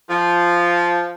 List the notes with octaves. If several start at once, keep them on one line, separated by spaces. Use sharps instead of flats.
F3